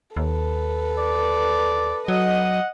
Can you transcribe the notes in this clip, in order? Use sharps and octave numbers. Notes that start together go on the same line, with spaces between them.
D#2 A4 B4
D5
F#3 D#5 F#5